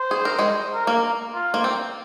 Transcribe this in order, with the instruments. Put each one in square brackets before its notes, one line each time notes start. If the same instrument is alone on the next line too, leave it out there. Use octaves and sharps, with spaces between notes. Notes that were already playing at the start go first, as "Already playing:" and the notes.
Already playing: [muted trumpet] C5
[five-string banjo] G#4
A#4
G#3 G#4
[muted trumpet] A#4
[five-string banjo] A#3
[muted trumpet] F4
[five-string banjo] A#3
C4